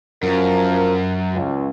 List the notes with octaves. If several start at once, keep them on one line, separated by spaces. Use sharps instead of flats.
F#2 F3 A#4
C#2